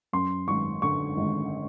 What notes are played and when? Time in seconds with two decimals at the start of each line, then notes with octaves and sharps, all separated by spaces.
0.13 F#2 C6
0.48 G#1 C#6
0.82 D3 C#6
1.17 G#1